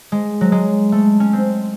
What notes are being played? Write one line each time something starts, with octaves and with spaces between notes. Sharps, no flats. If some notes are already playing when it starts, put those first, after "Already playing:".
G#3
F#3
G#3
A3
C#4
C4